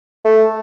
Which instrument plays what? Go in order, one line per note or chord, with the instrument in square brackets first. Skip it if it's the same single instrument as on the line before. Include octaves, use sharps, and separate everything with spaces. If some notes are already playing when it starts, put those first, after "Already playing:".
[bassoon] A3